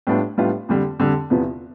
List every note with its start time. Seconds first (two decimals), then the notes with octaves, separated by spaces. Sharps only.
0.07 A2 G3 B3 D4 F4
0.38 A2 G3 B3 D4 F4
0.69 F2 D3 G3
1.00 F2 D3 G3
1.30 E2 C3 F3 B3 E4